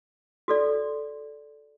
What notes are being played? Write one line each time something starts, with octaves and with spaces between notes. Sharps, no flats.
F#4 A4 D5